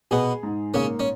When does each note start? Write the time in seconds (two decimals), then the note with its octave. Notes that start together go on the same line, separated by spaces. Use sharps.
0.11 B2 B3 G#4
0.43 G#2
0.74 C#3 A#3 C#4
1.00 C#4